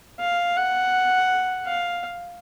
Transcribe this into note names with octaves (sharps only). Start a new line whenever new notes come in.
F5
F#5
F5